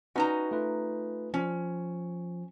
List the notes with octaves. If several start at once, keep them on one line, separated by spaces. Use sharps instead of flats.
C#4 D#4 F#4 B4 D#5 A#5
A3 F4 B4
F3 C#4